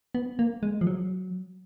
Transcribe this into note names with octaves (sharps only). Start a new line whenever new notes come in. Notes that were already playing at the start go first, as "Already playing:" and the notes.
B3
A#3
G#3
F3
F#3